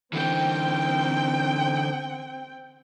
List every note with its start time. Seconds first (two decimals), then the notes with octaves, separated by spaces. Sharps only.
0.13 D3 E3 C4 G5